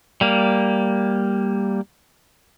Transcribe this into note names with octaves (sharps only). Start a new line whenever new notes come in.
G3 A#3